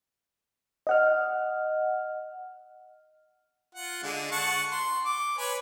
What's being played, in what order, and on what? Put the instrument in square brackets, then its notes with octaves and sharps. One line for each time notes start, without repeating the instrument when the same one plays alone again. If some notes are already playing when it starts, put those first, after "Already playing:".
[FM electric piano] D#5 F#5 F6
[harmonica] F4 F#5
D3 G#3
F#5 A5 C#6
C6
D6
B4 C#5 G#5